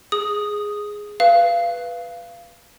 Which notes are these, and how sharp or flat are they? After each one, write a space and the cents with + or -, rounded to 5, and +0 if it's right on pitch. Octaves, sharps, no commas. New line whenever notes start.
G#4 +0 D#6 +0
B4 +0 F5 -20